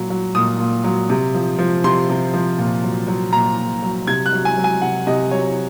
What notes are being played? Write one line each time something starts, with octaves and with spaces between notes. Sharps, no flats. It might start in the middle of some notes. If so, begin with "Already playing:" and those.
Already playing: A#2 F#3
F#3
A#2 D#6
A#2
F#3
C3
F3
F3
C3 C6
C3
F3
A#2
F#3
F#3
A#2 A#5
A#2
F#3
C3 G#6
F#6
F#3
G#5
F#3
G#5
C3 F#5
C3 D#5
F#3 C#5